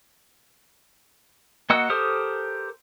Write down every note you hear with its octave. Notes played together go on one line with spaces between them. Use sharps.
A#3 F#4 D#5 F#5 E6
G4 A4 A#4 C5 D#6